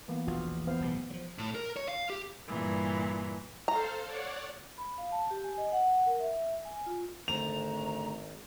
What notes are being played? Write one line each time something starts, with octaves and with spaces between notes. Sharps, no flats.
E3 A#3 B3
E1 A#1 F4 F#4
B3 C5 F5
D1 B1 B2
F3 F#3
A2
A#4
C#5
F5
G4
G2 A#2 E3
A4 C5 F5 A#5
C#5 D5 F#5
B5
F5
A5
G4
G#5
D#5
F#5
A#4
E5
G#5
F4
G#1 D3 A3 C4 A#5 F7